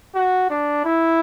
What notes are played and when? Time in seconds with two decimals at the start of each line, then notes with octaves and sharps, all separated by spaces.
0.15 F#4
0.50 D4
0.85 E4